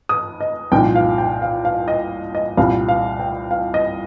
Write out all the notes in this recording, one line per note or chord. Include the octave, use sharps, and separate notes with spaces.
D#6
D#5
C2 A#2 F3 D#4 G5
F5
G5
F5
F5
D#5
D#5
C2 A#2 G3 F5
F5
G5
F5
D#5